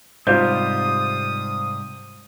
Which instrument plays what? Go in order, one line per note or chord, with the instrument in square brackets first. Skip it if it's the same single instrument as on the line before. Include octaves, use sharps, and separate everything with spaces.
[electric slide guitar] G#2 C3 G3 [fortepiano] F4 C5 [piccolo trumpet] D#6 [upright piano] G6